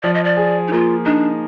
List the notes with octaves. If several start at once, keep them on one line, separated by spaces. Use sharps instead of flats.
F3 D5
D#5
D5
G#4
D#4
A#3 F4
D4 D#4